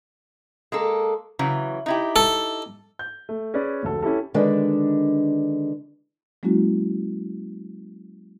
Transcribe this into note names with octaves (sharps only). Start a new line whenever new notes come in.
G#3 A#3 A4
C#3 E3 F#3
D#4 E4 G4
A4
G6
A3
C#4 G#4 B4 D5
F1 D2 A4
C#4 E4 G4 A4
D3 D#3 G#3 D4 B4
F#3 G#3 A#3 C#4 E4 F#4